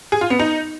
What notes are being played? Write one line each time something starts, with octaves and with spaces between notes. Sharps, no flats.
G#4
F4
B3
D#4